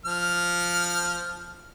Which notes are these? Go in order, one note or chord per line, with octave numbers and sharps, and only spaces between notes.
F3 F6